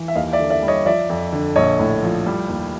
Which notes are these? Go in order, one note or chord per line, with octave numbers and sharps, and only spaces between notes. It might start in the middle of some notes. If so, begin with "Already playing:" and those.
Already playing: E3
E5
D#2 D#5 F5
D5 E5
D3
D5 E5
G3
C#5 D#5
F3 D5 E5
F2
D3
A#1 C#5 D#5
A2
F3
G3
D#2